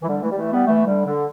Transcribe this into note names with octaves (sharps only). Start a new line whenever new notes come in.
E3
D3 G3
E3 A3
G3
E3 A3
G3 B3
E3 A3
D3 G3
D3